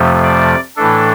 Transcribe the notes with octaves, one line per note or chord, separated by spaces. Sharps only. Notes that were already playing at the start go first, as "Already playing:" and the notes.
Already playing: F2 C3 F3 A3
D5
A2 E3 A3 D4 A4